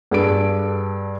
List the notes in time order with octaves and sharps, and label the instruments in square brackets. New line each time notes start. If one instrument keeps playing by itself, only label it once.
[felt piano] G2 G#4 A4 D7